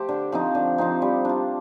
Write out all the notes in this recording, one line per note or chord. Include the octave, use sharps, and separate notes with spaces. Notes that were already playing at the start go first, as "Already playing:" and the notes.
Already playing: A3 G4 C5
D3
F3 C4 D#4
D3
F3 C4 D#4
G3
D4 F4